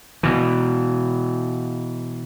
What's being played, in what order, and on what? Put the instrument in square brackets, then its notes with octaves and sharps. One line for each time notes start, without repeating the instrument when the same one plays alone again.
[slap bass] B2 E3